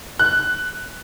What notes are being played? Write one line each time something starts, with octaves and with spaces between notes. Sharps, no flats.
F#6